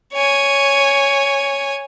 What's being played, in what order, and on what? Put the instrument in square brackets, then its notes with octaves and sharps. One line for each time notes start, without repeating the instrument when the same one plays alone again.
[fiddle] C#5 G#5